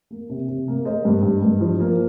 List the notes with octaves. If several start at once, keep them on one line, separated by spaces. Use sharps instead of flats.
A#3
C3
C3
A#3
A#3 C5 D#5
G2
G2
G2
F3
A#3